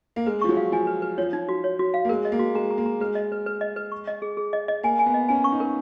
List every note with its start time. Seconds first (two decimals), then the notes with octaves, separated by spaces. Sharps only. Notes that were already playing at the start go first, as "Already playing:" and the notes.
0.16 A#3
0.26 G#3 B4
0.41 F3 C#6
0.49 F#3
0.57 F5
0.72 F3 G#5
0.87 B4
1.02 B4
1.18 F3 C#5
1.33 D#4
1.49 F#4
1.64 C#5
1.79 F#4
1.94 F5
2.05 A#3
2.09 G#3 A#4
2.25 D#5
2.32 A#3
2.39 F#4
2.55 G#3 A#5
2.71 A#5
2.78 A#3
2.86 A#5
3.00 G#3 B4
3.15 D#5
3.32 B4
3.46 B4
3.61 D#5
3.76 B4
3.92 C#6
4.07 D#5
4.22 G#4
4.37 G#4
4.53 D#5
4.68 D#5
4.83 A#3 G#5
4.99 G#5
5.06 B3
5.14 D#5
5.29 C#4 G#5
5.44 C#6
5.52 D#4
5.60 A#4